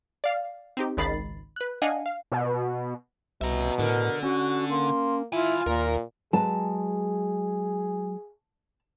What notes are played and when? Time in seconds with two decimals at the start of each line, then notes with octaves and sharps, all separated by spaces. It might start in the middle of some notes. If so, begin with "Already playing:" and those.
0.24 D5 F5
0.77 C4 D#4 G4
0.97 G#1 C#2 D#3 B5 A6 C7
1.56 B4 F#6
1.82 D4 D#5 F5 F#5 G#5
2.06 F5
2.32 B2
3.41 C2 B2 E5 A#5
3.79 A2 D3 A#4
4.23 C#4 F#4
4.70 A#3 C6
5.33 E4 F4 G#5 B5
5.67 D#2 A#2 A#4
6.33 F#3 G#3 G#4 B4 A5